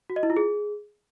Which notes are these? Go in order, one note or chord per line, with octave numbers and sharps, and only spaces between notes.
F#4
D#5
E4
F4
G#4